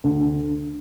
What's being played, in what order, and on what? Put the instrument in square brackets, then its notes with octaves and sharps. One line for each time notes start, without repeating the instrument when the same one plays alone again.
[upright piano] D2